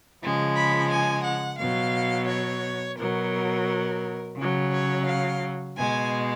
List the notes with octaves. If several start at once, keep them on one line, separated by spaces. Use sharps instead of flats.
C#3 F3 G#3
B5
G#5
F#5
B2 F#3 F5
C#5
B2 F#3 A#4
C#3 F#3
C#5
F5
B2 G#3 G#5